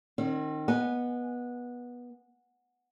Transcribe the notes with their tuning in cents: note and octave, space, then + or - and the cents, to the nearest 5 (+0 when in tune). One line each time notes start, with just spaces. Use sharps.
D#3 -20 C4 +40
B3 -15 D#5 +0 G#5 -10